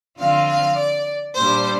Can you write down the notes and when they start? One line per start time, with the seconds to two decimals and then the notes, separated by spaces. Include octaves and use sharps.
0.19 D3 F3 C4 F4 F5
0.49 F5
0.78 D5
1.37 A#2 G3 D4 C5